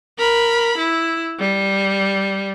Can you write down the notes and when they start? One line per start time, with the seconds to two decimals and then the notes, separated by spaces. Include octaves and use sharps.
0.18 A#4 B5
0.78 E4
1.40 G3